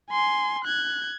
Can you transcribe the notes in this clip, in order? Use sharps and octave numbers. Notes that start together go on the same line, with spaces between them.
G#5 C6
F#6 G#6